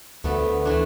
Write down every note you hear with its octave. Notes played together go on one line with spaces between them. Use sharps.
D2 A3 B3 A4
E3 A3 D4